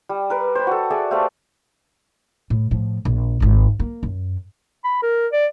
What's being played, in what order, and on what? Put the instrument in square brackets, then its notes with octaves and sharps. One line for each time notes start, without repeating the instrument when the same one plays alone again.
[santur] G3
A#4 B4
C5 B5
F#4 A4
G#4 D5 E5 A5
A3 G4 C5 F5
[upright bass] A2
A2 F3
A#1
G#1 F4
A#3
F#2
[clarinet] B5
A#4
D5